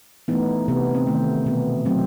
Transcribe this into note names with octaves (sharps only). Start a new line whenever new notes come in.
E3 A3 B3 D#4
C3 B3
C4
D#3 A3
B2 B3
F#3 A3 C4